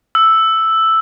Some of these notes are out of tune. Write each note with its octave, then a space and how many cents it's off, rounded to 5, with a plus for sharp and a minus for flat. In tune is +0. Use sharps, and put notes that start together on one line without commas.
E6 +0